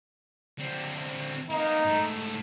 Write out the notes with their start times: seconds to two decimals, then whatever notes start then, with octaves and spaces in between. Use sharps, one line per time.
0.59 D3 C4
1.50 A#3 B3 D#4
1.85 G#2 A3